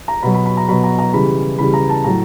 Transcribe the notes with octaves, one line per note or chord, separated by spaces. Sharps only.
A#5
B2 F#3 B5
B5
B5
A#5
B2 F#3 B5
A#5
A#5
C#3 E3 G3 B5
C#3 E3 G3 B5
A#5
A5
A2 F#3 A#5